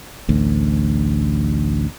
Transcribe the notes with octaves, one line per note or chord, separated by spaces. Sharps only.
A1 D2